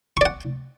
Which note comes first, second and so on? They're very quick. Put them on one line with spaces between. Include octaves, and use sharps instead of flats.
C#6 D5 F#5